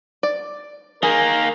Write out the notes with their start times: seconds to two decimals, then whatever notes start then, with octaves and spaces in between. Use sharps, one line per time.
0.23 D5
1.03 D#3 A#3 G#4 A#4